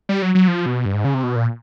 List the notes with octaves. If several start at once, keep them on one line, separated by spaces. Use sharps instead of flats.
G3
F#3
F#3
F3
B2
G2
G#2
C#3
C3
B2
A#2